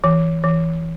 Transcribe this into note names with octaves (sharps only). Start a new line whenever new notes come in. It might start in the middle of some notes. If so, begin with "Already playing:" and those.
E3
E3